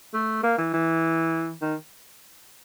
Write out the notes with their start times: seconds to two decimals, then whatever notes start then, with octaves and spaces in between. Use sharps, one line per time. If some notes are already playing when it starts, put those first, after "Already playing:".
0.14 A3
0.43 A#3
0.58 E3
0.74 E3
1.62 D#3